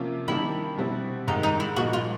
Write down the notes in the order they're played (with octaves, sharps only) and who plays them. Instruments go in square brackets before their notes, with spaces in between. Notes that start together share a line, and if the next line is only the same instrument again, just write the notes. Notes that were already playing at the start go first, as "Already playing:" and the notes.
Already playing: [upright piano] C3 F3 A#3 C#4 F4
[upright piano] D#3 G3 A#3 D4 G4 [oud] E4
[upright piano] B2 G3 C4 E4
[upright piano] G#2 D#3 G#3 [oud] D#4
[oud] D#4
E4
[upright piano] A#2 F3 A#3 D#4 [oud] F#4
[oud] F4